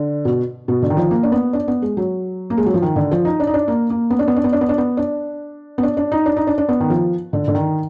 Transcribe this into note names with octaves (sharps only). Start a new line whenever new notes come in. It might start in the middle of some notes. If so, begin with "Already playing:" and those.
Already playing: D3
B2
B2
D3
D#3
F3
A#3
D4
B3
D4
B3
G#3
F#3
A#3
G#3
F#3
F3
D#3
D3
F3
D#4
D4
D#4
D4
A#3
A#3
B3
D4
B3
D4
B3
D4
B3
D4
B3
D4
B3
D4
D4
D#4
D4
D#4
D4
D4
B3
D#3
F3
D3
D3
D#3